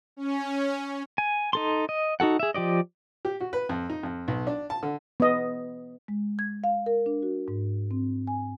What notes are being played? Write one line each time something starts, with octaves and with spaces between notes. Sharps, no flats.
C#4
G#5
D#4 A4 C6
D#5
D#4 F#4 A4 F#5
G#4 E5
F3 G4 D5 D#5
G4
F#4
B4
F2
D#4
F2
B1
D4
A5
D3
B3 D#5
G#3
G#6
F5
A#4
D4
F#4
G#2
C4
G#5